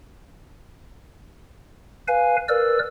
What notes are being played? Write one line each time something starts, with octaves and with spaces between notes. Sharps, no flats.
B4 F5 G#5
A#4 B4 D5 E6